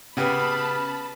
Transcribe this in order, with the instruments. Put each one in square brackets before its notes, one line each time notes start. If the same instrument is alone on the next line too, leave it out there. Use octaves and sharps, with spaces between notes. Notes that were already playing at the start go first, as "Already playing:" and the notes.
[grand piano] C#3 B3 G4 [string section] A5 B5